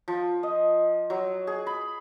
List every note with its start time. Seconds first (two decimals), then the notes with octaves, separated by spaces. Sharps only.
0.08 F3
0.43 D#5
1.10 F#3
1.47 G#4
1.67 B5